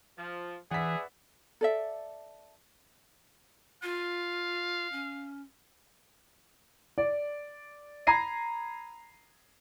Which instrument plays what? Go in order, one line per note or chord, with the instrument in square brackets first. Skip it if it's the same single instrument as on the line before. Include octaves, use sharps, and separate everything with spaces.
[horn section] F3
[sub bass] E3 [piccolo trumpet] G#4 [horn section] B4 D5 E5 [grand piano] F#5 B6
[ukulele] A4 D5 E5
[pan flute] F4 [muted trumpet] F5
[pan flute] C#4
[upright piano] D5
A#5 B5 G#6 A#6 C7 D#7